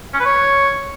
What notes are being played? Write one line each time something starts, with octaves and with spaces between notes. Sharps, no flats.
C#4
B4
C#5